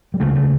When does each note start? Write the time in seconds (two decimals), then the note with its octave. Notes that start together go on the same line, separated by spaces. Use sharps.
0.14 G3
0.20 C#2 C#3 A3
0.36 A3